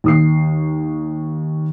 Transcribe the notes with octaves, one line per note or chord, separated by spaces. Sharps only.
D#2 D#6 C7